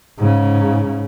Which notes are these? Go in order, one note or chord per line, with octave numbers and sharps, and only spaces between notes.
G#2 C#3